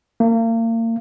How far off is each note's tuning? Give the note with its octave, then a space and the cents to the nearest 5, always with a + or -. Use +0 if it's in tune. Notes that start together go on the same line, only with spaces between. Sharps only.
A#3 -35